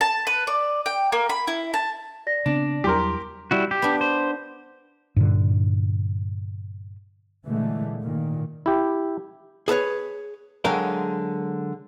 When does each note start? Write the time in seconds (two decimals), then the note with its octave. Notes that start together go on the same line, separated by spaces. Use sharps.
0.01 A5
0.27 B4
0.47 D5
0.86 G5
1.12 A#3
1.30 B5
1.48 E4
1.74 A5
2.27 D5 A#6
2.46 C#3 B3 C4 D4
2.84 E2 F#3 G3 E4 G4 A#4 C6
3.51 G3 E4 F#4
3.71 G4
3.82 B3 D4
4.01 C5
5.16 G2 A#2 D3
7.44 A#2 D3 E3 G#3 A3
8.02 A#2 D#3
8.66 E4 G4
9.68 G#4 A4 B4 C#5
10.64 D3 F#3 G#3 A#4 F5 G5